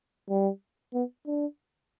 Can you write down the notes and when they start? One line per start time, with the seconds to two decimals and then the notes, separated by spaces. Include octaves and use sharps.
0.30 G3
0.94 B3
1.27 D4